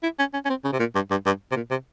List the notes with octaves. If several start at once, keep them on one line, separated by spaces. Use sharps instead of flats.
E4
C#4
C#4
C#4
C4
C#3
C3
A#2
G2
G2
G2
C3
A#2
C3